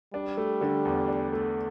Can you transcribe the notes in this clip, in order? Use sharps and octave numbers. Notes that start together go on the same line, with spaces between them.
G3 D4
A3
D3
E2
D4
A3